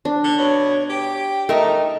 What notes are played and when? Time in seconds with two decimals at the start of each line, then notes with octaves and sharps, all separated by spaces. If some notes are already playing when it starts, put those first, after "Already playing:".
0.05 D4
0.24 D3
0.38 B2 C#5
0.89 G4 G5
1.49 A3 D#4 A#4